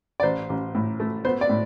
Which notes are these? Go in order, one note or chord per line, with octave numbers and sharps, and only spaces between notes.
D5
A1 C5
A1
A2
A3
B3 C5
D5
A2